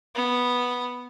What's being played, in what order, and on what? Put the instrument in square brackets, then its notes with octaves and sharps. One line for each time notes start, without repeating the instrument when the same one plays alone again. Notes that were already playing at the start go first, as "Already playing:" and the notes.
[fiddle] B3